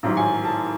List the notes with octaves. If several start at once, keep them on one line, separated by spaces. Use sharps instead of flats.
A1 G#2 D#3 F#3
G#5
A5